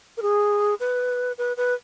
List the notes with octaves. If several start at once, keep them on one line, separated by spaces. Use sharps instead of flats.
A#4
G#4
B4
B4
B4